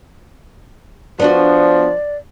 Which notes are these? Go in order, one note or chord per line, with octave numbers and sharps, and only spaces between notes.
F3 B3 D4 F#4 D5